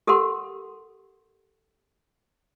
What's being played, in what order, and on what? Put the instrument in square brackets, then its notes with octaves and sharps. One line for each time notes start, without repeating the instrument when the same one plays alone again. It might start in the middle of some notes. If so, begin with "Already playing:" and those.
[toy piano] G4 A4 A#4 F#5 C6